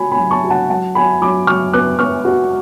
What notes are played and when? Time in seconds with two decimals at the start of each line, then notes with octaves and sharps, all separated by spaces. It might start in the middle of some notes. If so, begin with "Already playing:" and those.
Already playing: F#4 G#5 B5
0.12 G#5 B5
0.19 F#3
0.31 A5 C#6
0.44 F#4
0.50 F#5 A5
0.70 F#3 F#5 A5
0.95 F#4 G#5 B5
1.21 F#3 B5 D6
1.47 F#3 C#6 F6
1.73 B3 D6 F#6
1.99 B3 C#6 F6
2.25 F#4